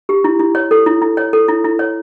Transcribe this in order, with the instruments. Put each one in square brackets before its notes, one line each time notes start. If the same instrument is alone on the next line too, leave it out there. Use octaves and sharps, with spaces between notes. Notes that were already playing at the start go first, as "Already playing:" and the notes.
[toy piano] G4
E4
E4
C#5
A4
E4
E4
C#5
A4
E4
E4
C#5